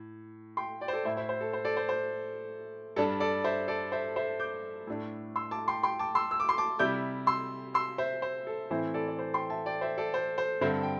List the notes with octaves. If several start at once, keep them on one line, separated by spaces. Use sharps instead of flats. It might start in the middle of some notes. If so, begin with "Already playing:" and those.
Already playing: A2
G5 C6
D5 G5
C5
A4 D5
A2 A3 E4 C5 E5
C5 E5
C5
A4
C5
A4 D5
C5
C5
G2 G3 D4 A4
A4 D5
C5 E5
A4 D5
C5 E5
C5 E5
D6 G6
A2 A3 D4
C6 E6
A5 D6
G5 C6
G5 C6
A5 D6
C6 E6
E6
D6
C6
A5 D6
C3 G3 E4 D6 G6
C6 E6
C6 E6
C5 E5
C5
A4
A2 E3 C4 E4 C5
A4 D5
D5
C5
G5 C6
E5 A5
D5 G5
C5 E5
A4 D5
C5
C5
G2 D3 C4 C5 E5
G5